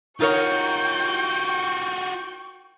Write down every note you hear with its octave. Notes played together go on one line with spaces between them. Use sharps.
D#4 F4 F#4 A#4 C#5 G5 C#6 G6